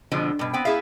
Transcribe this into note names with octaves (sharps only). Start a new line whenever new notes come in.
F2 B2 D3 F3 G#3
G2 B2
B3 C4 G5
B3 E4 G#4 E5 F5